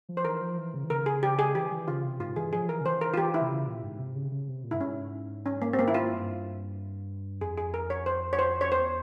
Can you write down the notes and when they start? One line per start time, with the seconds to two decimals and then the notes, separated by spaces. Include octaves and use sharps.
0.09 F3
0.17 C5
0.25 E3 A#4
0.41 F3
0.58 E3
0.74 C#3
0.84 E3
0.90 C#3 A#4
1.06 G#4
1.23 G4
1.39 G#4
1.55 E3 G4
1.71 E3
1.88 C#3 F4
2.04 C3
2.20 G#2 F4
2.36 E3 G#4
2.53 F3 G#4
2.69 E3 A#4
2.81 C#3
2.85 E3 C5
3.01 A#4
3.14 F4
3.17 E3 G4
3.34 E4
3.42 C3
3.51 C#3
3.67 A#2
3.83 G#2
3.99 C3
4.16 C#3
4.32 C#3
4.48 C3
4.64 A#2
4.71 G2 E4
4.81 G#2 C#4
5.46 C#4
5.62 A#3
5.73 C4
5.79 A#3
5.88 E4
5.94 F4
6.11 G2
7.41 F2 G#4
7.58 G#4
7.74 A#4
7.90 C#5
8.06 C5
8.33 C#5
8.39 C5
8.61 C#5
8.71 E2 C5